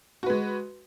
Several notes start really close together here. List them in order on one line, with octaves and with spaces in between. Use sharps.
F#4 B4 G#3